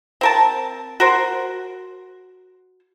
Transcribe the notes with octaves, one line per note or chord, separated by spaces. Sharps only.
C4 A#4 A5
F#4 A#4 C5